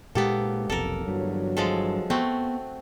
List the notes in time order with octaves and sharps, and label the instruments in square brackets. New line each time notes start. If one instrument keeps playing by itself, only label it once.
[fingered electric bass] A#2 G#3 [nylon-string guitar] A#3 G4 [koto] B3 A4
[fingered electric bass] F1 B1 F2 [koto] A4 A#4
[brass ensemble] G1 E3 F#3 [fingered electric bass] G2
[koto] F3 G#3 A4
[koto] A3 C4 F#4 [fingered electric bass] B3